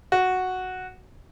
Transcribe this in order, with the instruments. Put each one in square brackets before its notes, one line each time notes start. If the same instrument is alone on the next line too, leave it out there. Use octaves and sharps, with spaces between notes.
[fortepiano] F#4